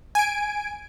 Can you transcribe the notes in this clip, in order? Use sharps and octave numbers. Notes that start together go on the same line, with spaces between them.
G#5 D7